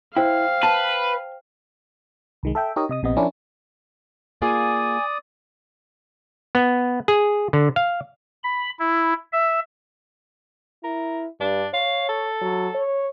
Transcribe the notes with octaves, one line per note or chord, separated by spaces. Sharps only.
E4 C5 F5 G5
B4 A5
C2 D#3 G#3
A4 E5 G5
D#4 G4 A#4 C#5 D#5
C3 D#5 D#6
A#1 C3 B3 D#5
F3 C#4 D4 E4 A#4 D5
A#3 F4 G#4 D5 G#5 D#6
B3
G#4
D3
F5
B5
E4
E5
E4 A#4
G2 D4
C#5 F5
A4
F#3
C#5